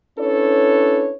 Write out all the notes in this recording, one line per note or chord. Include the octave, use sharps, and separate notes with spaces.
C#4 D4 E4 A4 B4 C#5